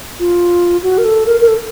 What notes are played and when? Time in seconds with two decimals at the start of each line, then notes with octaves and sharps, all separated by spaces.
0.20 F4
0.83 F#4
0.98 A#4
1.05 A4
1.26 A#4
1.41 A#4
1.48 A4